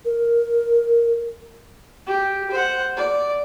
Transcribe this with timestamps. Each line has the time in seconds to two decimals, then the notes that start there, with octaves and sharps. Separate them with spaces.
0.05 A#4
2.06 G4
2.51 C5 F#5
2.97 D5